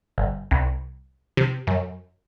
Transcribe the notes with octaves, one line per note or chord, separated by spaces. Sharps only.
G1
C2
C3
F#2